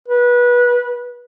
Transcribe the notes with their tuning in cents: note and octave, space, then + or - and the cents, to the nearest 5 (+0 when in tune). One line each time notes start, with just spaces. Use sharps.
B4 -25